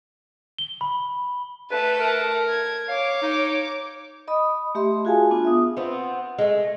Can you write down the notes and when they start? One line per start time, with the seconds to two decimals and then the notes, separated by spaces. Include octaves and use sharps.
0.58 G7
0.81 B5
1.71 A3 B4 A5
2.00 A#4
2.49 G#6
2.89 C#5 F5 D6
3.22 D#4
4.28 D#5 B5 D#6
4.75 A3 G4 E5 C6
5.05 F4 F#4 G#4 F5 G#5 A5
5.31 B3 D4 F4
5.45 E5 D#6
5.77 B3 C4 F4
6.39 G#3 A3